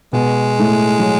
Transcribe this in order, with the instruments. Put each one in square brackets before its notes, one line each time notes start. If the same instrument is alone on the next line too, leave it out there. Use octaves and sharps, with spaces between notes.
[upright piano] B2 B3 [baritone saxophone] G#3
[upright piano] A2 A3
F#3